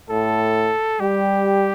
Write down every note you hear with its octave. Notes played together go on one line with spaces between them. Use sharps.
A2 A4
G3 G4